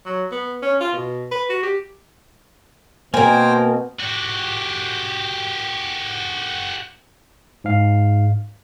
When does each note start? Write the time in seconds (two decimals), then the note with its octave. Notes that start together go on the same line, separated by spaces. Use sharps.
0.05 F#3
0.32 B3
0.63 C#4
0.81 F4
0.93 B2
1.31 B4
1.49 F#4
1.63 G4
3.14 B2 A#3 C4 A#4 C5 G5 G#5
4.00 F#4 G4
7.64 G#2 F5